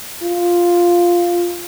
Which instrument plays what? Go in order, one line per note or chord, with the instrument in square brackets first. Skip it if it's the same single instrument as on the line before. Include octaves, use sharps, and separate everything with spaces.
[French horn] F4